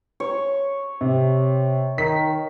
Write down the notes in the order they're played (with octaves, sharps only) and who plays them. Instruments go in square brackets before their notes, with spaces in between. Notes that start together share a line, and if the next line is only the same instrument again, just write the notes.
[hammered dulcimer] C#5
[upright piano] C3
[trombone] D#3 [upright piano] B6